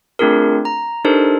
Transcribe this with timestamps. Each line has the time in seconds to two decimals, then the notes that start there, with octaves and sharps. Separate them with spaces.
0.19 A3 C4 D4 F4 G#4 A#4
0.65 A#5
1.04 D4 D#4 G4 A4 A#4 C5